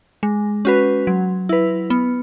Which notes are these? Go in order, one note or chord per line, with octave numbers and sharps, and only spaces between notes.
G#3
C#4 F#4 B4
F#3
E4 B4
B3